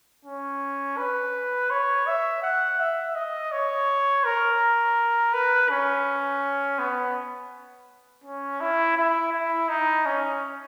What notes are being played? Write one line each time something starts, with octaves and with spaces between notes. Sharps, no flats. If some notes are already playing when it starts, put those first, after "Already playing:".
C#4
B4
C#5
E5
F#5
E5
D#5
C#5
A#4
B4
C#4
B3
C#4
E4
E4
E4
D#4
C#4